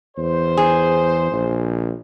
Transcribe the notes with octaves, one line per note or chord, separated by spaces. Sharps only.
E2 C5
G#4
A#1